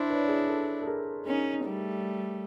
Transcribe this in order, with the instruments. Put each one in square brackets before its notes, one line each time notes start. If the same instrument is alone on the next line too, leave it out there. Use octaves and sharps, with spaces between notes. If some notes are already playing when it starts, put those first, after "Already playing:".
Already playing: [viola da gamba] D4 E4 [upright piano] C5 D5
[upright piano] B4 C#5
G#4
A4
A4
G#4 A#4
[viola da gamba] C#4 D#4 [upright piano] G#4 A#4
[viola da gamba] G3 A3